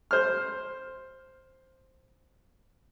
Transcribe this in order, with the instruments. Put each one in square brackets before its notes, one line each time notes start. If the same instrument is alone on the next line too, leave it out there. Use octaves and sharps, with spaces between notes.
[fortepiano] C5 F6